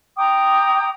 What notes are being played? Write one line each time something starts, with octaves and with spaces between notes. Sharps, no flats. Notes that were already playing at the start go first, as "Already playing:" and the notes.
G5 A#5 D6 D#6